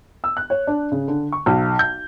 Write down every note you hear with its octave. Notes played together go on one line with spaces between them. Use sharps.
E6
F#6
C#5
D4
C#3
D3
C#6
B1
G6